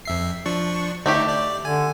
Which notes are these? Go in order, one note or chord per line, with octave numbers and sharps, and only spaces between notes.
F2 E5 C7
F3 D4 C#6
D3 A3 D4 D#4 G4
D5
D3 G#5